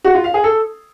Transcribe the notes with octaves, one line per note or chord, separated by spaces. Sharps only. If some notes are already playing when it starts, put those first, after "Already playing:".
F#4
F4
F5
G#4
A4